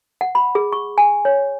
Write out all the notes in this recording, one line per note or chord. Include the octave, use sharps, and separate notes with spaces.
F#5
B5
G#4
C#6
G#5
C#5